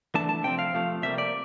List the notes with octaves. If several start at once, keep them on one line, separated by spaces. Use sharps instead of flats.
E3 A3 D4 A5
A5
C3 F3 C4 G5
F5
C3 F3 A3
C3 G3 A#3 E5
D5